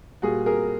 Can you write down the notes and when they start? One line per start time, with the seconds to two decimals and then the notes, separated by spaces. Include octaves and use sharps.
0.22 A#2 G3 F#4 G#4
0.46 G#4 A#4